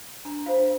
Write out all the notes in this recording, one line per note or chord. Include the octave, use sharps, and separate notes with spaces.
D4 A#5
F4 C5 F5